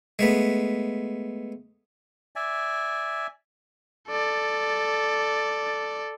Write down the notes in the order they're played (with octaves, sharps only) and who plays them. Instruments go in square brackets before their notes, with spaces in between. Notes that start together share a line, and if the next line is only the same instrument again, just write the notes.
[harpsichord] G#3 A3 B3
[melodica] D5 E5 G#5
[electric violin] A4 D5